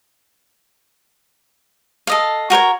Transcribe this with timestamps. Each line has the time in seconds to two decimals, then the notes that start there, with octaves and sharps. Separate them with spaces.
2.07 A4 D#5 F5
2.50 F#4 A#4 C5 C#5